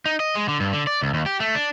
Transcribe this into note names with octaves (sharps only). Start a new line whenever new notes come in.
D#4
D#5
G#3
D3
G2
D3
D5
C#2
D#2
G4
A3
D4